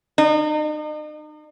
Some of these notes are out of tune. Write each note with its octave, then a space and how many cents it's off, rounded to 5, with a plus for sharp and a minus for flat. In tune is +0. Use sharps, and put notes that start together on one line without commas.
D#4 -40